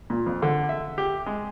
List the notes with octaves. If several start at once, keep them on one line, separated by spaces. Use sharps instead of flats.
A#2
F2
D3
E5
G4
G#3